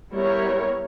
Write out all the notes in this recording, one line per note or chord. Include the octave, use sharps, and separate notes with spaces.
G3 B3 E4 A#4 C#5